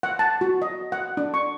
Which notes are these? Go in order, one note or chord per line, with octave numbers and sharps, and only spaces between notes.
F#5
A5
F#4
D#5
F#5
D4
C#6